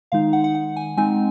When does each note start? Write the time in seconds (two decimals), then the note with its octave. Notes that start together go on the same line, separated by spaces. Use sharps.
0.12 D#3 G#3 D#4 F5
0.33 F#5
0.44 F#5
0.55 F#5
0.76 G#5
0.97 G#3 C4 D#4 G#5